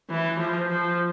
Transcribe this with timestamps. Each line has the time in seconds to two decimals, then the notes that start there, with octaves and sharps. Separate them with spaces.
0.10 E3
0.39 F3
0.69 F3